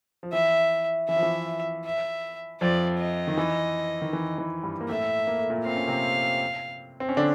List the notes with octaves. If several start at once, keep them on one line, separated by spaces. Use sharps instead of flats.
F3
E3 E5
E3 E5
F3
E3
E5
F2 F3 D5
D#5
D#3
E3
D#3
E3
E3
G2 G3
A#3
A2 A3 E5
A#3
A3
A#2 A#3
C4 F5
C#4
C3 C4
C4
C#4
D3 D4